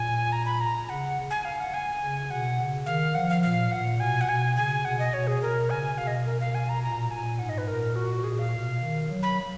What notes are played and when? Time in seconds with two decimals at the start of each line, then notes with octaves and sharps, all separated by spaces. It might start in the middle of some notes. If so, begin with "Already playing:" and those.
Already playing: A#2 G#5
0.32 A#5
0.46 B5
0.61 A#5
0.89 C#3 F#5
1.30 G#5
1.45 F5
1.60 F#5
1.74 G#5
2.02 C#3
2.30 B2 F#5
2.58 C#3
2.86 D#3 F5
3.15 F3 F#5
3.29 F5
3.43 A#2 F5
3.71 A#2 F#5
4.00 B2 G#5
4.21 F#5
4.28 B2 G#5
4.56 C#3 G#5
4.85 B2 F#5
4.99 D#5
5.14 B2 C#5
5.27 G#4
5.42 B2 A#4
5.70 C#3 G#5
5.98 B2 F5
6.07 D#5
6.26 A#4
6.40 F5
6.55 G#5
6.69 A#5
6.83 A#2 A#5
7.11 A#2 G#5
7.39 G#2 F#5
7.49 D#5
7.58 B4
7.67 A#2 A#4
7.96 F#4
8.24 A#2 G#4
8.39 F5
8.53 B2
8.81 D#3
9.09 F#3
9.23 B5